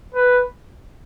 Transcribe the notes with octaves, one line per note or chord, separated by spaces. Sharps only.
B4